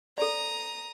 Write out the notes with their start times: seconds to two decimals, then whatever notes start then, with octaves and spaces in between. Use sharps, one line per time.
0.18 A4 D5 A#5 D#6